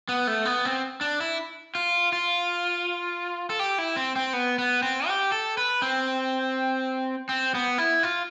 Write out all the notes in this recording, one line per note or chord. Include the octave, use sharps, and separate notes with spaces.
B3
A3
B3
C4
D4
E4
F4
F4
A4
G4
E4
C4
C4
B3
B3
C4
G4
A4
B4
C4
C4
B3
E4
F4